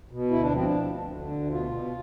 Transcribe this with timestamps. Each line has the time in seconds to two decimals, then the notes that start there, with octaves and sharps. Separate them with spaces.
0.11 B2
0.30 D2 E4
0.42 D4
0.51 F3 C4
0.65 D4
0.70 D2
0.91 D2
1.11 D3
1.31 D2
1.51 B2 F4
1.71 B2